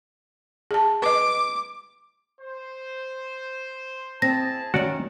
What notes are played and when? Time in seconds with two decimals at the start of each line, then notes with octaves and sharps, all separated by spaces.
0.71 G#4 A5
1.02 B4 D#5 D6
2.41 C5
4.22 C4 E4 G#4 A5 A#6
4.74 D#3 C#4 F#4 D5